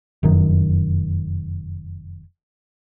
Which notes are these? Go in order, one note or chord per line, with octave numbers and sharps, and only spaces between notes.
F1 F#2 D#3